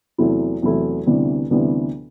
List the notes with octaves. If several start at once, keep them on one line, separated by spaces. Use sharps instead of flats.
E2 C3 F#3 A3 E4
E2 C3 F#3 A3 E4
D2 C3 E3 G3 B3
D2 C3 E3 G3 B3